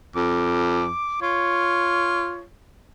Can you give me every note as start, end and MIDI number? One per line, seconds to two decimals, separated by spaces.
0.16 0.90 41
0.16 1.17 86
1.22 2.42 65
1.22 2.43 73